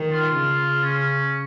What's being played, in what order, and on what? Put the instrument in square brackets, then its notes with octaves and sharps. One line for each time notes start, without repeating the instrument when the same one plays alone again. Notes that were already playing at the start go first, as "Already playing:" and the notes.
Already playing: [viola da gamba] D#3
[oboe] F4
[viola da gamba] C#3
[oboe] C#4